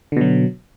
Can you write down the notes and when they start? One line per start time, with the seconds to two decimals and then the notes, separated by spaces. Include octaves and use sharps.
0.12 D3
0.17 B2
0.21 F#3